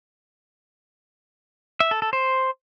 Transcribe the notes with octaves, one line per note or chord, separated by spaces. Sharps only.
E5
A4
A4
C5